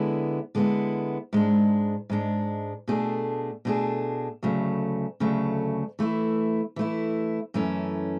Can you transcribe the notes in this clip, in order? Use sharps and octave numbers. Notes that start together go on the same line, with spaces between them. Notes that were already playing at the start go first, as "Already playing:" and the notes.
Already playing: D3 G#3 B3 E4
D3 G#3 B3 E4
G#2 G#3 D4
G#2 G#3 D4
B2 A3 D4 G#4
B2 A3 D4 G#4
D2 C#3 F#3 A3
D2 C#3 F#3 A3
E3 A3 E4
E3 A3 E4
F#2 E3 A3 C#4